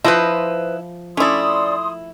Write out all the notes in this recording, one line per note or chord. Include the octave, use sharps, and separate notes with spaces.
F3 E4 B4 C5 D#5
A3 C#4 E4 D5 C6 D#6